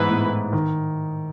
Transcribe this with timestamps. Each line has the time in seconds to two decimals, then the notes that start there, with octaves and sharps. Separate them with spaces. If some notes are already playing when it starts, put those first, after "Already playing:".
Already playing: G#2 E3 B3 E4 B4
0.09 A2
0.53 D#3